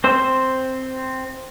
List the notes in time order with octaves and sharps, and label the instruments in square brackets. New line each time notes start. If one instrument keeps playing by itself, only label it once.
[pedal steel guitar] C4 C5 E6